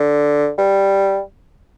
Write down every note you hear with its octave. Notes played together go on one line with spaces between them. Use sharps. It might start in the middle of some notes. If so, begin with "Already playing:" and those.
Already playing: D3
G3